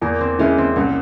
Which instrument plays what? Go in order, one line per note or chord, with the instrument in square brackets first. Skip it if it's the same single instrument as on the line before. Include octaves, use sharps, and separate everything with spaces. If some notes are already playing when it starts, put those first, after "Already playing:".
[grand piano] E2 [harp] A#3
[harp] C4
[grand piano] E3 G#3 E4 [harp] C#4
[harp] C4
[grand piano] C2 [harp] C#4